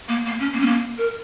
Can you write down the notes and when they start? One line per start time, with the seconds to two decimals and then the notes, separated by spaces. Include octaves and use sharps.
0.09 A#3
0.26 A#3
0.39 C#4
0.53 A#3
0.60 C#4
0.66 A#3
0.98 A#4